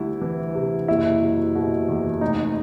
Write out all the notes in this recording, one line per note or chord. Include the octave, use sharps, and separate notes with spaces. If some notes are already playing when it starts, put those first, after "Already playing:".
Already playing: D2 G3 E4
E3
C3
F#1 E4
F#3
B2
E2
F1 D#4